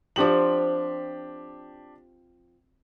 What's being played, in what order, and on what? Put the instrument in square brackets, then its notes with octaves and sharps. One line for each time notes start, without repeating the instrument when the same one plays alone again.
[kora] F3 C4 F#4 [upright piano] D4 G4 F#7